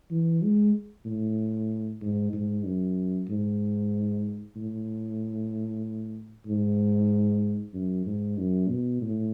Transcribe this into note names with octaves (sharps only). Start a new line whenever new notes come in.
E3
G#3
A2
G#2
G#2
F#2
G#2
A2
G#2
F#2
G#2
F#2
B2
A2